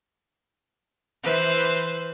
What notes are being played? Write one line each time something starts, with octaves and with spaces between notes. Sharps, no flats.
E3 B4 C5